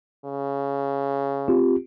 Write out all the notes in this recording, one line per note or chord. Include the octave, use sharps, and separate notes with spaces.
C#3
C4 F4 G4